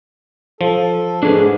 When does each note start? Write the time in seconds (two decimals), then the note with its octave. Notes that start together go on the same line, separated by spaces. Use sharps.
0.61 F3 A4
1.23 G#2 D4 G#4 B4